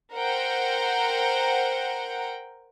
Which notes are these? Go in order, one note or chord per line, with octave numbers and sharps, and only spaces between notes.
A#4 C5 F#5 G5